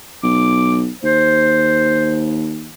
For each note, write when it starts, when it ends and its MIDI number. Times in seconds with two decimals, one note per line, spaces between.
0.23 0.90 35
0.23 0.79 86
1.03 2.71 39
1.03 2.43 72